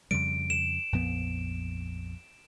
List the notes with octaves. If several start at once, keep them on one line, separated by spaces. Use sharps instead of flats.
F2 C#3 G3 D7
E7
A#1 F2 B3